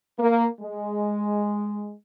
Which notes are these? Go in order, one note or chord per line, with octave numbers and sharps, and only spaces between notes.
A#3
G#3